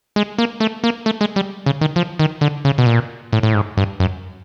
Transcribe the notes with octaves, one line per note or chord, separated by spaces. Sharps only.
G#3
A#3
A3
A#3
A3
G#3
G3
C#3
D#3
F3
D#3
D3
C#3
B2
A#2
A2
A2
G#2
G2
F#2